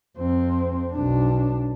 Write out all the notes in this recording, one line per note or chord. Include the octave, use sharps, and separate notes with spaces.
F2 C4
B1 D4